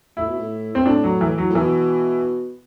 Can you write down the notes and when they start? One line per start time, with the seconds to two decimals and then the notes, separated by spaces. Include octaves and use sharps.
0.17 A2 E4
0.28 B2
0.39 A2
0.75 C4
0.86 A2 D4
1.04 F#3
1.21 E3
1.38 F#3
1.50 A2
1.55 B2 E3